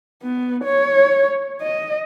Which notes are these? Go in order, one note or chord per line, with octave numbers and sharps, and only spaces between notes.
B3
C#5
D#5